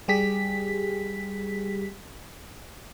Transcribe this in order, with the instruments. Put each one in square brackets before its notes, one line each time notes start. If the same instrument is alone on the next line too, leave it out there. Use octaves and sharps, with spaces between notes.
[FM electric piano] G3 G4 G#4 B6